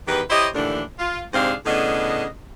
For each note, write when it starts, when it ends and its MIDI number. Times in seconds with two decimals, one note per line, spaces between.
0.08 0.21 40
0.08 0.21 51
0.08 0.21 67
0.08 0.21 71
0.30 0.47 64
0.30 0.47 67
0.30 0.47 72
0.30 0.47 73
0.30 0.47 75
0.55 0.82 39
0.55 0.82 45
0.55 0.82 50
0.55 0.82 52
0.55 0.82 62
0.99 1.21 65
1.33 1.53 44
1.33 1.53 48
1.33 1.53 60
1.33 1.53 62
1.33 1.53 68
1.33 1.53 77
1.66 2.25 45
1.66 2.25 49
1.66 2.25 59
1.66 2.25 62
1.66 2.25 75